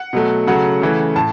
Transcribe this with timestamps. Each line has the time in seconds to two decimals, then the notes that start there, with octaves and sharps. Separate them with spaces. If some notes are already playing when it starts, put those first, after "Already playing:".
Already playing: F#5
0.13 B2 F#3 A3
0.47 C#3 F#3 A3 F#5
0.82 C#3 E3 A3
1.16 A2 A5